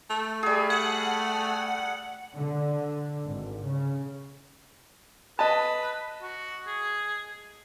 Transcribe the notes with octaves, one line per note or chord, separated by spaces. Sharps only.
A3
G3 G#4
F#5
D3
G#1
C#3
B4 D#5 A5
F#4
G#4